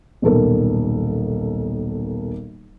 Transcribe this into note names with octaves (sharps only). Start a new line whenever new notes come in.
D#1 B1 A4 A#4